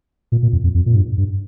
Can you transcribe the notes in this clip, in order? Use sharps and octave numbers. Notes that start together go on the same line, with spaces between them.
A#2
A#2
F2
F2
F2
A#2
G2
G2